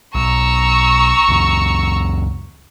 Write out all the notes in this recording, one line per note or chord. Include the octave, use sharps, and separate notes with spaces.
B1 A#5 C#6 E6
C#2 F#2